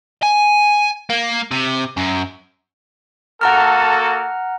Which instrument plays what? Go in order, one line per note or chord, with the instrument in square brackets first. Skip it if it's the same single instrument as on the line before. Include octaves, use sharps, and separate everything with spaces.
[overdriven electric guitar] G#5
A#3
C3
F#2
[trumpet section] A#3 F#4 A4 [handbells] F#5 A#5 F6